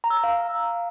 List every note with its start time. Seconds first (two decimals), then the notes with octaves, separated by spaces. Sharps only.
0.04 A#5
0.10 E6
0.17 A#5
0.24 F5